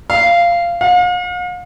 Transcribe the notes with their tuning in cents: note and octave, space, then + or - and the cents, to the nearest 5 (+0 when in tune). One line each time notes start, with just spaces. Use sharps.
F5 -15
F5 +40